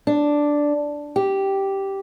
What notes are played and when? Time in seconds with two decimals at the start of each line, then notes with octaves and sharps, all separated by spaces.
0.07 D4
1.16 G4